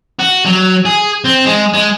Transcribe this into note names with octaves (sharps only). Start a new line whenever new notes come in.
F#4
F#3
G#4
C4
G#3
G#3